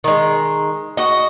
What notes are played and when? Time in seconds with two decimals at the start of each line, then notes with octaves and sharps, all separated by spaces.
0.04 D#3 G#3
0.97 F#4 D#5